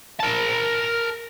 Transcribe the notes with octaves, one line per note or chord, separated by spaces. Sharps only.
A#4 A5